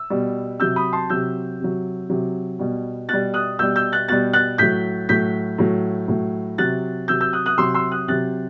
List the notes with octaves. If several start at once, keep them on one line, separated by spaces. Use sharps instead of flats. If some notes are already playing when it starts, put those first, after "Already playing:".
Already playing: E6
B2 G3
C3 F#3 E6 G6
B5 D#6
A5 C6
C3 F#3 E6 G6
C3 F#3
C3 F#3
B2 G3
B2 G3 F#6 A6
D#6 F#6
B2 G3 E6 G6
E6 G6
F#6 A6
B2 G3 F#6 A6
F#6 A6
A2 F#3 G6 B6
A2 F#3 G6 B6
A2 F#3
A2 F#3
C3 F#3 F#6 A6
C3 F#3 E6 G6
E6 G6
D#6 F#6
D#6 F#6
C3 F#3 C6 E6
C6 E6
D#6 F#6
C3 F#3 F#6 A6